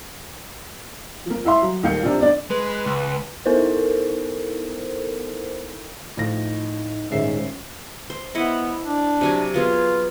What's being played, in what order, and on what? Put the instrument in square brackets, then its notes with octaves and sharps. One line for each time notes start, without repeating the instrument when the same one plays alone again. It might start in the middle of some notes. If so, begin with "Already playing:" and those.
[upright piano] F3 A#3
E4 E5 F5 C6
F#3
D#1 D#2 A#3 F5 G6 C#7
C3 C4 D4 F4
B3 D4 D5
[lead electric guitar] G#3 [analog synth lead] B4
[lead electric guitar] C#2
[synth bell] B3 D#4 E4 A4 A#4 C5
[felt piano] A2 F3 A#6 [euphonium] D#4
[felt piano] D#1 E5 C7 [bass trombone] G#2 [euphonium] C#4
[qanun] C5
[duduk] B3 [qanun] E4 D#5 F#5
[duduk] D4
[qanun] C3 F#3 G#5
[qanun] F#3 B3 G#4 [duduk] F4